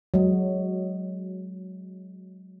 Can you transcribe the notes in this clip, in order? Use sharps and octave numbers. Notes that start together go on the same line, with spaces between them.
F#3 G#3